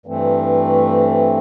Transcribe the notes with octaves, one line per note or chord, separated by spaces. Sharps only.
G2 E3 A3 C4